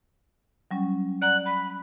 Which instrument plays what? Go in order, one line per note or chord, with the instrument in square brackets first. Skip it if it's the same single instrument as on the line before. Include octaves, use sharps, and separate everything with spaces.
[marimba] F#3 G3 C#4
[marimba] D5 F#5 A#5 [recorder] F#6
[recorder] B5